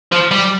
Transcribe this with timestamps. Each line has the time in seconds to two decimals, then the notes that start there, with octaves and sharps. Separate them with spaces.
0.12 F3
0.31 G3